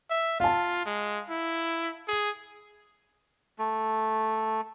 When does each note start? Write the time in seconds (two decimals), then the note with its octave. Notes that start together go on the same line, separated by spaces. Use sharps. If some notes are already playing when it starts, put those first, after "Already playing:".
0.10 E5
0.40 F4 F5 A5
0.86 G#3
1.30 E4
2.08 G#4
3.58 A3